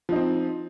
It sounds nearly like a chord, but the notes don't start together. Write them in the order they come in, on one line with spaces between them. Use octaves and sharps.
F3 D#4 C4